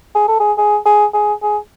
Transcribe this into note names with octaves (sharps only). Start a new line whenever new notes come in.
G#4
A4
G#4
G#4
G#4
G#4
G#4